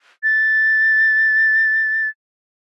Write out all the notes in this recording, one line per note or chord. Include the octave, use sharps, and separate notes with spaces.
A6